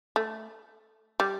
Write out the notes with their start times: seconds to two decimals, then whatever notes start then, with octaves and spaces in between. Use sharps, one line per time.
0.16 A3
1.20 G3